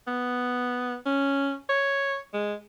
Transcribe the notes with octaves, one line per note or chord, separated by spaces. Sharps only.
B3
C#4
C#5
G#3